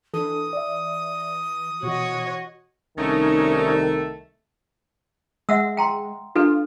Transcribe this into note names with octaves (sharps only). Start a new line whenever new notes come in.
E3 D4 A4 D#6
D5 E5
B2 E3 F#4 C#5 D#5
C2 D#3 A3 C#4 D#4
G#3 E5 F#5 E6
G5 A#5 C6
D4 F4 A4 B4